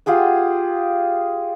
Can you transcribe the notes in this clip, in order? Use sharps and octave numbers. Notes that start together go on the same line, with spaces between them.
F4 G4 G#4 F#5